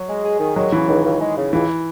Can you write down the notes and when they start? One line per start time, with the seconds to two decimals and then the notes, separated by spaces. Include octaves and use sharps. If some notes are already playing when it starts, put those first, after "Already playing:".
Already playing: F#3
0.09 G#3
0.25 G#4
0.40 D#3
0.56 F#3 G#3
0.72 C#3 E3
0.88 C#2 D#3
1.04 C#2
1.20 G#3
1.37 C#3
1.53 C#2 E3